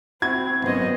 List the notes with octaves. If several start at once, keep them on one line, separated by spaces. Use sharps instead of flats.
C4 E4 F#4 G#6
G#1 F#2 B3 C#4 C5 D#5